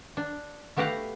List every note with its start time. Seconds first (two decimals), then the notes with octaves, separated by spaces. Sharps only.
0.17 D4
0.77 A3 B3 F#4 G4 F5 F#5